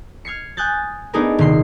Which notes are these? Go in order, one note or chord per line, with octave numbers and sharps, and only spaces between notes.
F6 G#6 C7 C#7
G#5 D#6 F#6 G6 A6
A3 B3 D4 D#4 G#4 A#4
D#1 C3 C6 C7